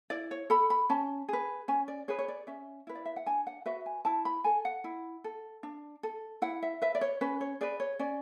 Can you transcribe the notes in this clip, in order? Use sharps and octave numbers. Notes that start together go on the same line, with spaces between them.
E4 D5
C#5
A4 B5
B5
C#4 A5
G#4 B4
C#4 G#5
D5
G#4 B4 C#5
C#5
D5
C#4 E5
E4 B4
D5
E5
F#5
D4 G#5
F#5
F#4 B4 E5
G#5
E4 A5
B5
A4 G#5
F#5
E4
A4
D4
A4
E4 F#5
E5
B4 E5
D5
C#5
C#4 B4
C#5
G#4 B4 D5
C#5
C#4 D5